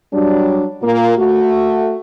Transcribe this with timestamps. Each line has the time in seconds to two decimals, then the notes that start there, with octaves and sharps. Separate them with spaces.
0.13 F#3 G3 D4
0.82 A#2 A#3 F4
1.18 A3 F#4